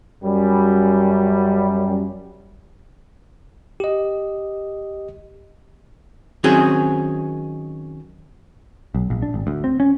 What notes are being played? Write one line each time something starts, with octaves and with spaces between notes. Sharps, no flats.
F#2 G3
G4 D#5
D#3 F#3 C4 C#4 F#4 G#4
B1
A#1
D4
G#1
D2
C4
C#4